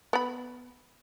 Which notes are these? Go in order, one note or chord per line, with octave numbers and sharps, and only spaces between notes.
B3 B5